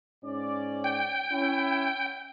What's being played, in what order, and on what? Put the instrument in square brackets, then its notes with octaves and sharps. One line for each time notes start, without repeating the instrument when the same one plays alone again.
[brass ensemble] G#2 C#4 D5
[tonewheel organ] G5
[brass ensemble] C#4 E4